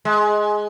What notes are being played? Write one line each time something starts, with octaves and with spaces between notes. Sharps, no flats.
G#3